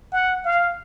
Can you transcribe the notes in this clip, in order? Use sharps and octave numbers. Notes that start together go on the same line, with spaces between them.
F#5
F5